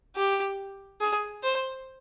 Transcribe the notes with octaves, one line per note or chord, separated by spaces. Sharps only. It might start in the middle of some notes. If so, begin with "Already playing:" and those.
G4
G#4
C5